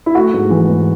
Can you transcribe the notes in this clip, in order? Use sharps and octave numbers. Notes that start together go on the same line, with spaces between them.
E4
A3 F#4
G#2
E3
G#2